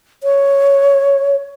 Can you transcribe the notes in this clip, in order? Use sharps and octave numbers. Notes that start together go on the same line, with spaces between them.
C#5